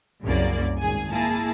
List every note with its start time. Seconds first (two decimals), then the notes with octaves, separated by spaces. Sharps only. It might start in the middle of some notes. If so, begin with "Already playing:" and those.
0.24 C2 F#2 C#3 F#3 A#3 D5
0.79 G#1 G#4 G#5
1.11 A#3 E4 G#4 A5